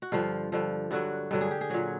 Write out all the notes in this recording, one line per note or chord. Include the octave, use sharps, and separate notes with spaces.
F#4
G2 D3 F3 F4
G2 D3 F3
G2 D3 F#3 F#4
G2 D3 F#3
G#4
G4
G#4
A#2 F#3 F#4